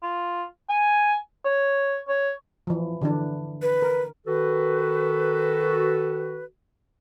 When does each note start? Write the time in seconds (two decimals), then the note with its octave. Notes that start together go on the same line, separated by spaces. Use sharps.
0.03 F4
0.69 G#5
1.45 C#5
2.08 C#5
2.67 E3 F3
3.02 D3 E3 D4
3.62 B4
3.82 A#4
4.27 D#3 F#4 A4 B4